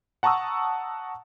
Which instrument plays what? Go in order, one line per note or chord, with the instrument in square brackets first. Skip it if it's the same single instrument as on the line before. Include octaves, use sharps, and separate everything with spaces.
[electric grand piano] F#5 A5 A#5 C#6 D#6 E6